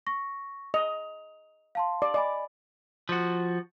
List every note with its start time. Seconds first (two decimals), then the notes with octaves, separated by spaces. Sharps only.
0.07 C#6 A#6
0.74 D#5 F7
1.75 F5 A5 C6
2.02 D5
2.14 D5 D#5 G#5 B5
3.09 F3 F#4